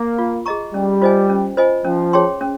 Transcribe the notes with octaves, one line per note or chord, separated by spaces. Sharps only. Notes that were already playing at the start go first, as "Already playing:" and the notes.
Already playing: A#3
F4
G#4 D#5 A#5 C#6
G3 C#4
F4 C5 D#5 G#5
C#4
F4 C5 D#5 G#5
F3 C#4
G#4 C#5 G5 C6
C#4